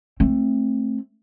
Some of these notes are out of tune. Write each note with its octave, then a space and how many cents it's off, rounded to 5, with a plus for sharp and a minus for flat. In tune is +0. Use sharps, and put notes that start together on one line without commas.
A3 +0 C4 +20